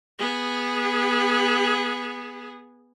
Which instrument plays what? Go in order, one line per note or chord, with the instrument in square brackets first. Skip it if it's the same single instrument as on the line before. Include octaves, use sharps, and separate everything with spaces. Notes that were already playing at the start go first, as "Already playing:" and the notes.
[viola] B3 G#4